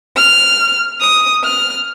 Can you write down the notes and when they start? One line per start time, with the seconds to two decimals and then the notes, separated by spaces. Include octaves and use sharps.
0.16 F6
1.00 D#6
1.43 F6